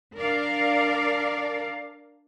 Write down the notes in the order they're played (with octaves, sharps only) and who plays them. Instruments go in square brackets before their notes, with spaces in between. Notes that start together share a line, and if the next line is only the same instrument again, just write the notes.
[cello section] D4 A#4 D5 F5